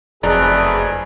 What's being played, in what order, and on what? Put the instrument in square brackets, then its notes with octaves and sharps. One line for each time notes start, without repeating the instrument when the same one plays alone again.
[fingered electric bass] F#1 [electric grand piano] F2 D5 A#5 [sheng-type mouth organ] A3 D#4 B4 [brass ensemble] G#4